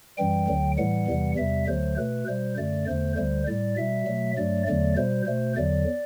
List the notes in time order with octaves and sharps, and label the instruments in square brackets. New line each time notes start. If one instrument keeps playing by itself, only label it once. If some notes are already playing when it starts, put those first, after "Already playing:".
[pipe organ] F#2 E3 G3 G5
D2 D3 F#3
A2 E3 G3 F#5
E2 C3 E3 G3
E2 C3 G3 E5
D2 D3 F#3 A3 C5
B2 A3 B4
B2 G3 C5
F#2 D3 A3 D5
E2 D3 A3 C5
D2 D3 G3 C5
A2 G3 D5
B2 G3 E5
B2 F#3 A3
G2 F#3 A3 D5
E2 D3 F#3 A3 D5
B2 G3 C5
B2 A3 C5
E2 D3 F#3 D5